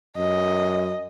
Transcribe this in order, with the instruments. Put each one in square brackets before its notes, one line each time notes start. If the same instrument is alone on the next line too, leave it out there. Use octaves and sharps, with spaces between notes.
[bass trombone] F#2 [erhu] D#5